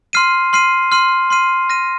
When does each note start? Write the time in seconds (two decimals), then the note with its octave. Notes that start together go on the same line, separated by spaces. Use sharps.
0.13 C6 F6 C7 D#7
0.53 C6 F6 C7 D#7
0.92 C6 F6 C7 D#7
1.30 C6 F6 C7 D#7
1.69 F6 A#6 D#7